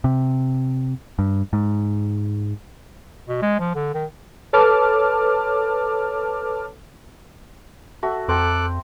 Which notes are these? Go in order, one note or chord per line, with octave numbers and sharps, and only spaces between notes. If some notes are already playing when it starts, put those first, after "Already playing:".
C3
G2
G#2
B2
G#3
F3
D3
D#3
A4 B4 C#5 A5 D6 F6
F#4 A4 E5
F2 A4 C5 G5 A#5 D6 F#6